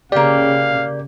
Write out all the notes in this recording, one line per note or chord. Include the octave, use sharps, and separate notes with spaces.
C#3 A#3 G4 D5 F5